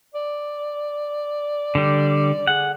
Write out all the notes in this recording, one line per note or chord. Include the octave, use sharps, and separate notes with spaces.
D5
D3 G3
G#4 F#5